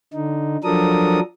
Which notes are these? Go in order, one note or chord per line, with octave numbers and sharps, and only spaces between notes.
D3 D#4
F3 F#3 D4 A4 A#4 D#6